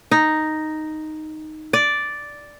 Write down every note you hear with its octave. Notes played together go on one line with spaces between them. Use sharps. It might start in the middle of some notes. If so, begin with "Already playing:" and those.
D#4
D5